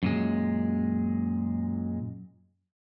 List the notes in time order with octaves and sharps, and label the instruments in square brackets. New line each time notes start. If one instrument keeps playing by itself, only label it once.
[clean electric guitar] F#2 A#2 G#3